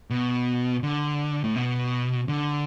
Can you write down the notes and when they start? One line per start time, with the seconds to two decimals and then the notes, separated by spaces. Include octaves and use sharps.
0.10 B2
0.83 D3
1.44 A2
1.56 B2
2.29 D3